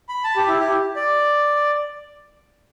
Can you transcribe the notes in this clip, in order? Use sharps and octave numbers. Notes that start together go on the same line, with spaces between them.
B5
A5
G4
E4
G4
D5